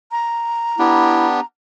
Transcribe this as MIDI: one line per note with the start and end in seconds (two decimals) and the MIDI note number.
0.11 1.45 82
0.79 1.40 59
0.79 1.40 62
0.79 1.27 64
0.79 1.40 67